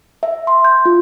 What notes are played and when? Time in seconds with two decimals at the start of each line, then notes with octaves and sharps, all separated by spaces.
0.23 E5
0.47 C6
0.65 G6
0.86 F4